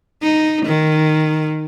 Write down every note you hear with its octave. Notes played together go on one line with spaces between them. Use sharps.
D#4
D#3